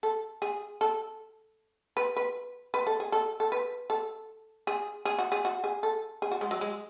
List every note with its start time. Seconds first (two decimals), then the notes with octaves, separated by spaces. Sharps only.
0.03 A4
0.42 G#4
0.81 A4
1.97 B4
2.17 B4
2.74 B4
2.87 A4
3.00 G#4
3.12 A4
3.40 A4
3.52 B4
3.90 A4
4.67 G#4
5.05 G#4
5.19 F#4
5.32 G#4
5.45 F#4
5.64 G#4
5.83 A4
6.22 G#4
6.31 F#4
6.41 G#3
6.51 F#3
6.61 G#3